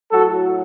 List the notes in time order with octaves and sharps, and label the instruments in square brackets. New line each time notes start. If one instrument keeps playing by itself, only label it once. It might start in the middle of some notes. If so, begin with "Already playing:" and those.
[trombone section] A2 F#3 F#4 A4